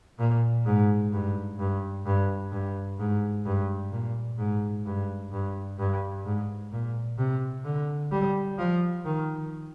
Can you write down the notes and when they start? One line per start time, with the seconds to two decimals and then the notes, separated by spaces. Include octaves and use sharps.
0.19 A#2
0.66 G#2
1.13 G2
1.59 G2
2.06 G2
2.52 G2
2.99 G#2
3.46 G2
3.92 A#2
4.38 G#2
4.86 G2
5.32 G2
5.79 G2
6.25 G#2
6.72 A#2
7.18 C3
7.65 D3
8.11 G3
8.58 F3
9.05 D#3